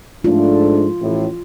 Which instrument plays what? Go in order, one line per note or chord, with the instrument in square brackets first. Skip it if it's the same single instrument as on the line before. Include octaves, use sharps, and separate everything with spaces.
[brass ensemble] G#2 A3 D4 [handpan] F4
[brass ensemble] A1 A2